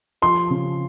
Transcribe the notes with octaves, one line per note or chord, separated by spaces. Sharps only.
F3 C6
C#3